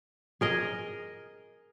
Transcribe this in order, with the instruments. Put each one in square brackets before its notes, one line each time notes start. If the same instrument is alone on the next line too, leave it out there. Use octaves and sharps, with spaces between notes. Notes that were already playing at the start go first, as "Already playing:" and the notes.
[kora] G#4 A#4 D#5